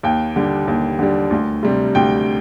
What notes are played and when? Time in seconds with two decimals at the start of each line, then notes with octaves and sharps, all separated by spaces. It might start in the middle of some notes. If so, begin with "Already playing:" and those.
0.03 D#2 G5
0.36 D3 G3
0.68 D#2
0.99 D3 G3
1.31 D2
1.63 C3 G3
1.95 D2 G5